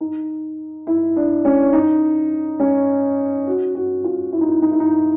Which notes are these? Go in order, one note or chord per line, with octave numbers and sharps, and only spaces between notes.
D#4
E4
D4
C#4
D#4
C#4
F#4
F#4
F4
E4
D#4
E4
D#4
E4
D#4